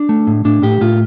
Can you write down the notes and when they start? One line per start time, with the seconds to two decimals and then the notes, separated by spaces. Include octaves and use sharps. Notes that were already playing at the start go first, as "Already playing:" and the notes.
Already playing: D4
0.09 A3
0.27 A2
0.45 A2 D4
0.63 A2 G4
0.81 A2 F4